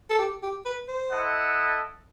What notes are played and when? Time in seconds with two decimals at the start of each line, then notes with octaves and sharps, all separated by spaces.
0.10 A4
0.19 G4
0.43 G4
0.66 B4
0.88 C5
1.11 E4 A4 D#5 F#5